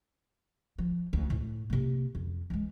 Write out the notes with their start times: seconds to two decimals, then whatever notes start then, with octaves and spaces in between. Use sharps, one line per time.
0.78 F3
1.13 D2
1.30 A2
1.70 C3 A#3
2.15 F2
2.50 E3 G#3